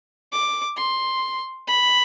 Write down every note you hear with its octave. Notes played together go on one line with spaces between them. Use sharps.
D6
C6
B5